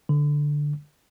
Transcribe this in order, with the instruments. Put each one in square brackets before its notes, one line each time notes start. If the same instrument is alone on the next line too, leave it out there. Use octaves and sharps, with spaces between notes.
[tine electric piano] D3